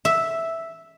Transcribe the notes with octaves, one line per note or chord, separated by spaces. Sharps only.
E5